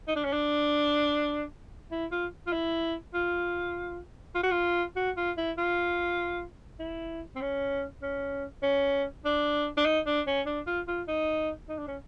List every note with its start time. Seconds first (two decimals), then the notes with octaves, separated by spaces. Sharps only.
0.08 D#4
0.16 D4
0.24 C#4
0.33 D4
1.92 E4
2.11 F4
2.47 F4
2.52 E4
3.14 F4
4.35 F4
4.43 F#4
4.51 F4
4.96 F#4
5.17 F4
5.38 E4
5.58 F4
6.80 E4
7.36 C4
7.42 C#4
8.02 C#4
8.63 C#4
9.25 D4
9.77 D4
9.85 D#4
10.07 D4
10.27 C#4
10.46 D4
10.67 F4
10.88 F4
11.08 D#4
11.69 D#4
11.78 D4
11.88 C#4